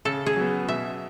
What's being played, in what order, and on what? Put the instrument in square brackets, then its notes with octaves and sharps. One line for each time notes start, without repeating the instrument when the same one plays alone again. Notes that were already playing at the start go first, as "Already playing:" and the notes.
[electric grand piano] C#3 [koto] A4
[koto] G#4
[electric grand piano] F#3 B3
[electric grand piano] B2 [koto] E5